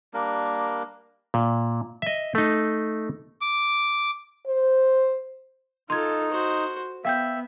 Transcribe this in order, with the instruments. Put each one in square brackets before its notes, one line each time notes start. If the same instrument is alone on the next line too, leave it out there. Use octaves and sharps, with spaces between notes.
[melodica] G3 A#3 D4 A#4
[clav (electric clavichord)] A#2
D#5 E5
A3 D#4
[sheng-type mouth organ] D6
[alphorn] C5
[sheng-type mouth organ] D#4 [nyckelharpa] F4 A4 [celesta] C6 G#6
[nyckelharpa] F#4 C5
[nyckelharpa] B3 [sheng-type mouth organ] E5 [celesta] F5 G5 G6